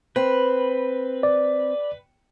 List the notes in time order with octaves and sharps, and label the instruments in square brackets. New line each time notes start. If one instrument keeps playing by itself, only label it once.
[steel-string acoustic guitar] C4 [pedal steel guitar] B4
[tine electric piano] D5